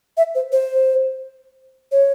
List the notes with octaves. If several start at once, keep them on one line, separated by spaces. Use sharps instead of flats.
E5
C5
C5
C#5